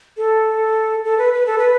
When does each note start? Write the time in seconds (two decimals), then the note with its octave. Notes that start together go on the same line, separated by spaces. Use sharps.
0.17 A4
1.04 A4
1.18 B4
1.33 B4
1.46 A4
1.58 B4